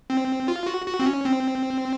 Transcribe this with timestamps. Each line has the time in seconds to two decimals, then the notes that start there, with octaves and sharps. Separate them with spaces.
0.10 C4
0.48 F4
0.67 F#4
0.86 F#4
0.99 C4
1.06 C#4
1.25 C4